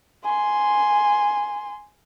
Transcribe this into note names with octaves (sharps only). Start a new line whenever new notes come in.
G#5 C6